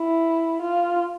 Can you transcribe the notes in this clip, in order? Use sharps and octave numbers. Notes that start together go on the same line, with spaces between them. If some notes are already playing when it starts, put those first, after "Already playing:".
Already playing: E4
F4